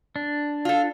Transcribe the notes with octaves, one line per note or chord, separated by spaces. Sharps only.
D4
F4 A4